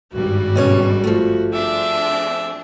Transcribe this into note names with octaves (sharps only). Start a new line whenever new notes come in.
G#1 G2 G3 F#4
B2 C#4 C#5
F3 A3
C4 D4 G#4 E5